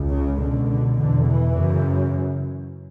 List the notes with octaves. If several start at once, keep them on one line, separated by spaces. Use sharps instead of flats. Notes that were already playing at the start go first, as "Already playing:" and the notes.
Already playing: C#2
C#3
C#2 B2 D3
D3
E2 B2 D3
E3
F#2 C#3